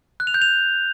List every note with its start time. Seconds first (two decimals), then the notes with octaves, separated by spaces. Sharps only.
0.20 F#6
0.27 F7
0.34 G6
0.42 F7